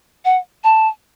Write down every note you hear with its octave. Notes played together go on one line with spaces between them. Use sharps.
F#5
A5